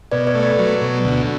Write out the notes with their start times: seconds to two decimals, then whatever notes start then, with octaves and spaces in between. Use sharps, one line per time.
0.12 B2 B4 D5
0.27 B4 D5
0.35 A3
0.43 B4 D5
0.59 F#3
0.82 B2
1.05 D2